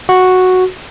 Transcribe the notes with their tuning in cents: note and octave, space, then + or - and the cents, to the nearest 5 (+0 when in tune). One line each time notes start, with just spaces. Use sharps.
F#4 -5